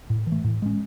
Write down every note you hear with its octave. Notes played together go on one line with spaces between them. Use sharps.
A2
E3
A3
A2
G#3 C#4